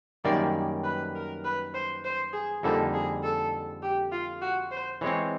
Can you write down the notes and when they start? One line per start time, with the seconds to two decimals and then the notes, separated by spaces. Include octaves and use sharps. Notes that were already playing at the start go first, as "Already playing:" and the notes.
0.24 F#2 D#3 G3 A#3 D5
0.84 B4
1.15 A#4
1.45 B4
1.74 C5
2.04 C5
2.33 G#4
2.63 F2 D3 G3 A#3 D#4 A4
2.93 G#4
3.23 A4
3.82 G4
4.12 F4
4.41 F#4
4.71 C5
5.01 E3 G#3 C4 C#5